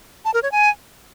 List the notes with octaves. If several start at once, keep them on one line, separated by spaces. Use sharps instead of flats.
A5
A#4
C#5
G#5